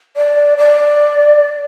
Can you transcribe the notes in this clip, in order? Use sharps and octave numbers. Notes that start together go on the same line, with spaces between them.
D5
D5